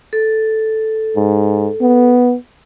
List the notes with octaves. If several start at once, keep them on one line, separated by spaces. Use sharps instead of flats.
A4
G#2
B3